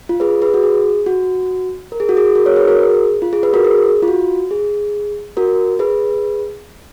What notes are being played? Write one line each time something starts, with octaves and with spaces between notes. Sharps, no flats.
F4
G#4 B4
G#4 B4
F#4
G#4
F#4
A#4
G#4
F#4
G#4
F#4 A#4
A#4 C#5
G#4 B4
F#4 A#4
G#4
F4
G#4
G#4 B4
F#4 A#4
G#4
F4
F#4
G#4
F#4 A#4
G#4 B4